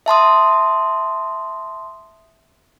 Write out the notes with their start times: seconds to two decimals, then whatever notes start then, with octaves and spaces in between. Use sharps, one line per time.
0.06 E5 A5 C6 D#6